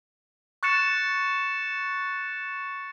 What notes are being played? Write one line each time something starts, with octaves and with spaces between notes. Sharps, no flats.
C#6 F#6 A6 C#7 E7